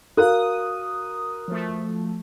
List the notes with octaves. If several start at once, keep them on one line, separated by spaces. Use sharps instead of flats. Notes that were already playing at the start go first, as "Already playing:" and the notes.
F#4 A#4 F5 D#6 F#6
F3 A3